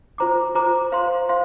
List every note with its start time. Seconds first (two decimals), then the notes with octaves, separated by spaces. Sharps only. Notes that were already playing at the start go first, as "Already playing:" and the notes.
0.18 F4 C5 A#5 D6
0.55 F4 C5 A#5 D6
0.92 C5 F5 C6
1.29 C5 F5 C6